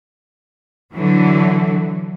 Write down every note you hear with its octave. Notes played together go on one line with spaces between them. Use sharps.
D3 E3 F#3